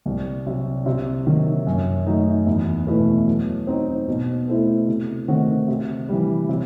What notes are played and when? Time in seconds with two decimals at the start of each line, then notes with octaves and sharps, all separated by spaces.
0.06 C2
0.47 C3 F#3
0.86 C3
1.27 D#3 F#3
1.67 F#2
2.06 F#3 A3 D#4 F#4
2.47 E2
2.87 B2 A3 E4 B4
3.27 F#3
3.67 C4 D#4 F#4
4.08 B2
4.48 A3 E4 A4 C5
4.88 C3
5.28 D#3 A3 C4 F#4
5.68 C3
6.09 E3 G3
6.49 C3